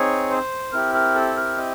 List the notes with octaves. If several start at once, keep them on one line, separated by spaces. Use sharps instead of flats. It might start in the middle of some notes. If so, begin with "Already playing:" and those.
Already playing: C4 D#4 G#4 C#5
C5
C4 E4 G4 A#4
A#4
A4
A#4
D#5